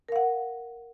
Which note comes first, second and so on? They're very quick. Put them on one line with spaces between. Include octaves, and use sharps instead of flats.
A#4 F5 F#5